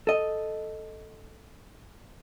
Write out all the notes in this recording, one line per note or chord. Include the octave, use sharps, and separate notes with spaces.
A4 D#5